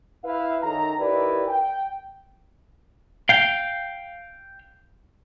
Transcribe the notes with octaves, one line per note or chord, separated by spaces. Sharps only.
E4 B4 E5 F5
F#2 D#3 A4 A#5
D#3 E4 G4 A#4 B4 D5
G5
F5 G5